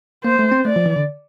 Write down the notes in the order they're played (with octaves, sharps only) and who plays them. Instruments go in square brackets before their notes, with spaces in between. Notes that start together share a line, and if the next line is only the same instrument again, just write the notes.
[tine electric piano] A#3 [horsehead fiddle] C5
[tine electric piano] A3
C4
[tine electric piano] A3 [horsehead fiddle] D5
[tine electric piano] F3
E3
D3